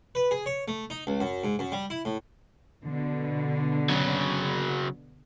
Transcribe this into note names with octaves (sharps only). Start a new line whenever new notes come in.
B4
G#4
C#5
A3
D#4
C#2
F#2
G#2
F#2
G3
E4
A2
B2 D3
C#3 F#3